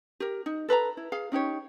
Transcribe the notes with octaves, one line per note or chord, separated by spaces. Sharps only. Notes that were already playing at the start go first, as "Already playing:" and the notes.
G4 A#4
D#4
A4 B4 C5 A#5
E4
G#4 F5
C#4 D#4 G4 C#5